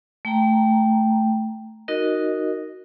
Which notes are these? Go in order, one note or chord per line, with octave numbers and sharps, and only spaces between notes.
A3 G5 A#5
D#4 F#4 A#4 D#5